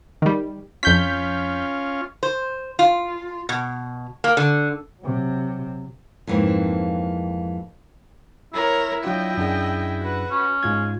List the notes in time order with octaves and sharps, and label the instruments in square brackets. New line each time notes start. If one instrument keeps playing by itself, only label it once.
[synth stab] D#3 G3
[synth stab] F2 G6 B6 [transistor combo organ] C#4 F4
[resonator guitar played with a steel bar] C5
F4
B2
A#3
D3
[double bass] C3 F#3
[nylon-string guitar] F2 G#2 E3 A#3 C4
[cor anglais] E4 [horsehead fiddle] A#4 C#5
[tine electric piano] F#3 D4 F4 [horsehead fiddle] D#5 G5
[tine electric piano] F#2 D4 G#4
[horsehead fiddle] F#4 B4
[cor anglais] C#4
[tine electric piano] G#2 F4 G#6 [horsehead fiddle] G#3